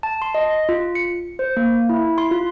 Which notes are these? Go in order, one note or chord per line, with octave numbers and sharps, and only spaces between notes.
A5
C6
D#5
F4
C#7
C5
A#3
E4
C6
F4